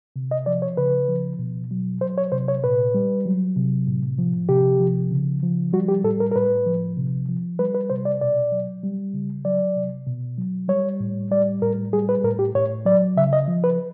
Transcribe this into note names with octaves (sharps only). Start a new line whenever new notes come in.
C3
D#5
F3 D5
C#5
C#3 B4
F3
B2
F#3
F#3 C5
C#5
C3 C5
C#5
A#2 B4
G3
F#3
C3
A2
F3
C3 G4
F3
C#3
F3
G3 F#4
G4
A2 A4
A#4
A#4
A2 B4
F3
C3
F3
G3 B4
B4
C3 C5
D5
B2 D5
F#3
G3
C#3
F#3 D5
C3
B2
F#3
G3 C#5
A2
G3 D5
A2 A#4
G3 G#4
B4
A2 A#4
G4
A2 C#5
F#3 D5
C#3 E5
D#5
F3
B4